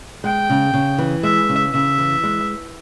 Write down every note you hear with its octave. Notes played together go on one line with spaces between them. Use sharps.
G#3 G5
C#3
C#3
E3
G#3 E5
C#3
C#3 E5
E3
G#3